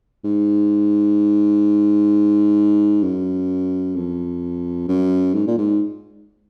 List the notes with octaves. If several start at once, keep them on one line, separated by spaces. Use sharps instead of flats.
G#2
F#2
F2
F#2
G#2
A#2
G#2